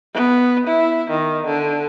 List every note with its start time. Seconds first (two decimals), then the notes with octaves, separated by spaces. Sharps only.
0.14 B3
0.67 E4
1.10 D#3
1.47 D3